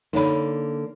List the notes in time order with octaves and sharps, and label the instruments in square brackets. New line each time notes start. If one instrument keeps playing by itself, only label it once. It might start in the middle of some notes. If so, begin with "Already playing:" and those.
[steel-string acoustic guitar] D3 A#3 [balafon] D#4 C#5 B5